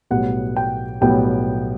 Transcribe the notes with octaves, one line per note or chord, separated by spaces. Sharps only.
B1 A2 G3 B3 F#5
G5
B1 A2 G3 B3 G5